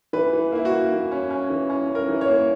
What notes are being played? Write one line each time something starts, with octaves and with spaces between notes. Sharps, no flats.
E3 B4
E3
A#3 E4
F#4
A#3
E3
C#4
C#4
E3
C#4
C#4
A#4
E3
C#5
A#3